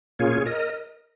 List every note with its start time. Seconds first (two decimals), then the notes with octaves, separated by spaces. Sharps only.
0.19 A#2 A#3 C#4 F4 G#4 C#5
0.46 A#4 D#5